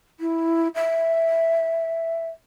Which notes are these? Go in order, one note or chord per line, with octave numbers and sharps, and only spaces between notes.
E4
E5